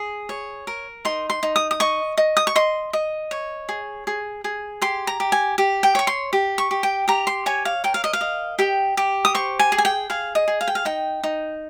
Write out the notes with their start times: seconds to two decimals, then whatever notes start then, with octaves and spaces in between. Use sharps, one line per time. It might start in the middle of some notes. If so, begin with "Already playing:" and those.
Already playing: G#4
0.29 C#5
0.67 A#4
1.05 D#4 C6
1.30 C6
1.43 D#4
1.56 D#6
1.71 D#6
1.80 D#5 C#6
2.18 D#5
2.37 D#6
2.47 C#6
2.55 D#5 C6
2.93 D#5
3.31 C#5
3.69 G#4
4.07 G#4
4.44 G#4
4.81 G4 C6
5.07 A#5
5.20 G4
5.32 G#5
5.58 G4
5.83 G5
5.95 C#5 C#6
6.07 C6
6.33 G4
6.58 C#6
6.71 G4
6.83 G5
7.08 G4 A#5
7.27 C6
7.46 C#5 G#5
7.65 F5
7.84 A#4 G5
7.94 F5
8.04 D#5
8.13 F5
8.21 D#5
8.59 G4 G5
8.97 G4
9.25 D#6
9.35 C5 C#6
9.59 G#5
9.72 G#4
9.78 G#5
9.85 G5
10.10 G#4 F5
10.35 D#5
10.48 G#4
10.61 F5
10.68 G5
10.75 F5
10.85 D#4 G5
11.24 D#4